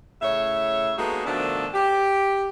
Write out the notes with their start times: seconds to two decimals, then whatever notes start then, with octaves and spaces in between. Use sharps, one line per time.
0.22 A2 C#3 C#5 E5
0.98 G#3 A#3 B3 D#4 F#4 A4
1.26 B2 D#3 F3 A3 D4 A4
1.74 G4